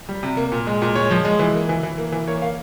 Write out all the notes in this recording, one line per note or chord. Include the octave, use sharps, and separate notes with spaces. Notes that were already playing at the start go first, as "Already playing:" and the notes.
G3
C3
A#3
A#2
G#3
A#2
G#3 C#5
F3
G#3
E3
A#3
E3
E3
A#3
E3
A#3 C#5
A#3 F5